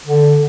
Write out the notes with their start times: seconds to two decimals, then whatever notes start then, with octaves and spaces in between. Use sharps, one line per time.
0.05 D3